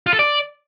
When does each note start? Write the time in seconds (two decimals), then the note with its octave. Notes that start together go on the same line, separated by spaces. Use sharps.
0.07 F4
0.13 A4
0.19 D5